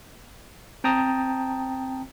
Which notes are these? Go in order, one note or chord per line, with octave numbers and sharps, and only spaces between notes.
C4 G5 A5 A#5 D#6